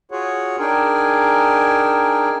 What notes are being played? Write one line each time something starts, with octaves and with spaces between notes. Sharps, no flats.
F4 F#4 G#4 C#5 F#5
D4 D#4 G#4 A#4 G5 G#5